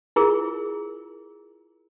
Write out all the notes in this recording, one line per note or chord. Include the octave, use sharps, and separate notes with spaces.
E4 F4 G#4 A#4